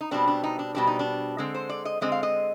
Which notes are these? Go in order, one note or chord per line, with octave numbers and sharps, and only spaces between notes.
D#4
B2 G3 C4 D4
D4
D#4
D4
B2 G3 C4 D4
D#4
D4
D3 G#3 C4
C5
D5
D#5
D3 G#3 C4 D#5
F5
D#5